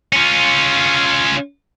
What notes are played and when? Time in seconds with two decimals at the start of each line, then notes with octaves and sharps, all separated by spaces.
0.13 C#4 F4